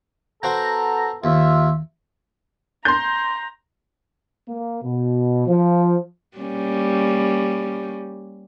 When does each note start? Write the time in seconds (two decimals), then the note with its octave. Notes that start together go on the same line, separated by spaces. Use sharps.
0.43 B3 F#4 A4 C5 G5 A#5
1.24 D#2 F4 E5
2.85 A#5 C6 G6
4.48 A#3
4.83 B2
5.47 F3
6.37 G3 A#3 C#4